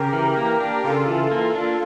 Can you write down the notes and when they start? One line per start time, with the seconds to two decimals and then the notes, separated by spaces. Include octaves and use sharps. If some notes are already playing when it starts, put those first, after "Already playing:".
Already playing: C#3 G4 A#4
0.13 E3
0.37 A#3
0.60 D4
0.83 C#3 F4 A4
1.08 E3
1.31 A#3
1.55 D4